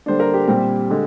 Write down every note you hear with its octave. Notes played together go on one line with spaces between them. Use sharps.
D3 G3 A#3 D4 C5
A#4
G4
A#2 G3 C4 G4
D3 G#3